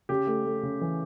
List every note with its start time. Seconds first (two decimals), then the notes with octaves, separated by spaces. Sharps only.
0.09 C#3 G4
0.27 A3
0.45 A3
0.63 C#3
0.81 E3